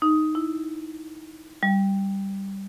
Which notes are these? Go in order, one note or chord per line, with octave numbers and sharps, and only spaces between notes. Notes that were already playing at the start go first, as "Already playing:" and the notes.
D#4
E4
G3